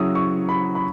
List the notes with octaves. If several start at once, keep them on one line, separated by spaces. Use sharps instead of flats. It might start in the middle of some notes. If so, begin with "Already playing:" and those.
Already playing: C#3 F#3 C#4 E4 D#6 E6
C#6
B5
B5